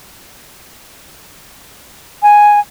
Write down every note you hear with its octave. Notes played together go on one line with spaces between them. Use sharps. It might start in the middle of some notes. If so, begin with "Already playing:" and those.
G#5